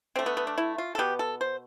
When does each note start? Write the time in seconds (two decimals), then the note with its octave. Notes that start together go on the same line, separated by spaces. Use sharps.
0.16 D3 A3 C4
0.26 B3
0.37 B3
0.47 D4
0.58 E4
0.78 F4
0.95 A4
0.98 B2 B3 G4
1.19 A4
1.41 C5